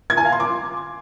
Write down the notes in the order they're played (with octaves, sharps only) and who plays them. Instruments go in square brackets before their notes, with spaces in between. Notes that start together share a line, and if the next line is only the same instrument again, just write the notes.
[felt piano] G#6
G#5
F5
C6
D6